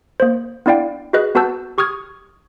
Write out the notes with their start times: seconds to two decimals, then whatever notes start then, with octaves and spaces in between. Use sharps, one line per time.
0.20 A#3 C5
0.66 B3 D4 E4 D5 F5 G5
1.13 F#4 G#4 B4 D#5 F#6
1.35 B3 F#4 B4 A5 E6 G6
1.78 G4 C#6 D#6 F6 G#6